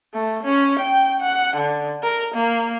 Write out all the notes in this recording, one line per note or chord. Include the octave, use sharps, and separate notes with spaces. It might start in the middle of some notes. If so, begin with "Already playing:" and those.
A3
C#4
G5
F#5
D3
A#4
A#3